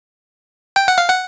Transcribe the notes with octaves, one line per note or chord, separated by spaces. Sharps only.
G5
F#5
F5
F#5